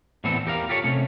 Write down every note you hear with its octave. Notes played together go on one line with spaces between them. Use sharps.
A2 D3 E3 B3 C4 A4
E2 G4 A#4 F5
F4 G4 A4 C#5
C3 A3 C#4